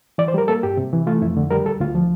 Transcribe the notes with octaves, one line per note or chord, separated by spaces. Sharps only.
E3 D5
C5
G3 A#4
A#3 A4
G2 G4
C3
E3
A3 F4
F2 E4
D3
G3 A#4
D2 A4
D2 F4
F3